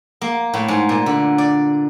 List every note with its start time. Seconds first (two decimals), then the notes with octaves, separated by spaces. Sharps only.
0.21 A#3
0.54 A2
0.68 G#2
0.89 A#2
1.06 D3
1.38 D5